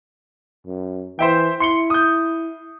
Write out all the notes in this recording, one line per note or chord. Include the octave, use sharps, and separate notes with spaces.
F#2
E3 C5 E5 G5
E4 C6 C#7 G7
D#6 G6